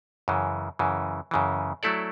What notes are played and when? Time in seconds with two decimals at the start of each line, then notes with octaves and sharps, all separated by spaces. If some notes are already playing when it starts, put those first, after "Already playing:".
0.28 F#2 C#3 E3
0.79 F#2 C#3 E3
1.31 F#2 C#3 E3
1.83 F#3 A3 E4 A4 D5